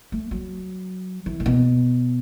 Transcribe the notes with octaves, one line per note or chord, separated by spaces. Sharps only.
A3
F#3
E3
A2
B2